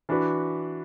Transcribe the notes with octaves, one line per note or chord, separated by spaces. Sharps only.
E3 D4 F#4 B4